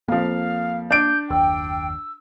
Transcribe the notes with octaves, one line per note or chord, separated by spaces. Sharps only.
F2 F3 A#3 F5
D4 G6 D7
F#1 D#2 G5 E6